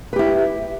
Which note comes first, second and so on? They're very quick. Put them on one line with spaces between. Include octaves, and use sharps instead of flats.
B4 G4 E4